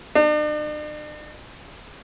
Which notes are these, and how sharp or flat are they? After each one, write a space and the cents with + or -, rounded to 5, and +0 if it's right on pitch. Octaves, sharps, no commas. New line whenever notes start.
D4 +45